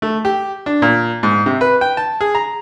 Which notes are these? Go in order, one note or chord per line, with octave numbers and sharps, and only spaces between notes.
A3
G4
D4
A#2
G#2
C3
B4
G5
A5
G#4
A#5